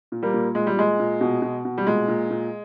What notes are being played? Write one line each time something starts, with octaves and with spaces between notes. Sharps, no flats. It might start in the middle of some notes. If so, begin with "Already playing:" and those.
A#2
G3 A#3
A#2
A#2 G#3
G3
A#2 G#3
A#2
B2
B2
B2
G3
A#2 G#3
A#2
A#2